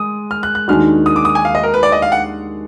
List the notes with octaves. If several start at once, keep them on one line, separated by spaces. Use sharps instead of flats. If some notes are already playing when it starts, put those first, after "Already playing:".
Already playing: G#3 D#6
F6
F#6
F#6
D#2 D#3 G#3 D4 F#4 F6
D#6
D6
D#6
G#5
F5
D#5
A#4
B4
D5
D#5
F5
F#5